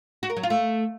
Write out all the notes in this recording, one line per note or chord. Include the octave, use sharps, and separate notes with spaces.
F#4
A#4
F#3
F4
A3